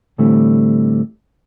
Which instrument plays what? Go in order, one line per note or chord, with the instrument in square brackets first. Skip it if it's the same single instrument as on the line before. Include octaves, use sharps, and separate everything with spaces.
[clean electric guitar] A2 D3 E3 G3 A3 C4